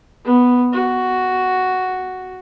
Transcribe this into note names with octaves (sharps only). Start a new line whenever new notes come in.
B3
F#4